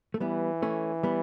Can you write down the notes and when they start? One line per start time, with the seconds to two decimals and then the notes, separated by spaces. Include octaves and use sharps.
0.14 A3
0.20 E3 G3 B3
0.62 A3 C#4
1.03 G3 B3